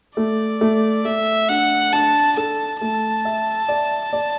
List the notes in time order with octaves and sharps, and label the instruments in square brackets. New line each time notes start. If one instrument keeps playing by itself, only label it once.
[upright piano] A3 [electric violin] D5
[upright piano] A3
[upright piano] A3 [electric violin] E5
[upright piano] D4 [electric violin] F#5
[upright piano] D4 [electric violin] A5
[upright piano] A4 [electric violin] A5
[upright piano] A3 [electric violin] A5
[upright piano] E5
D5
D5